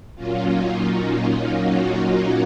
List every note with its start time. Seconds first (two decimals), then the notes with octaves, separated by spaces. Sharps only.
0.16 A#2 F#3 A#3 C#4 F4
0.51 D#4
0.87 F4
1.59 D#4 F#4